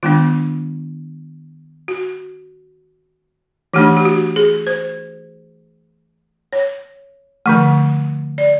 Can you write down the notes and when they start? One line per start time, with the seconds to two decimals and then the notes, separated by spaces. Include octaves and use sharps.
0.03 D#3 G#3 B3 D4 F4
1.88 F#4
3.74 E3 A3 D4 G4
3.97 G4
4.05 F#4
4.36 G#4
4.67 C5
6.53 C#5
7.46 D3 F3 A3
8.38 D5